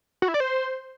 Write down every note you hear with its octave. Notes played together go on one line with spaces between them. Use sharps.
F#4
E4
D5
C5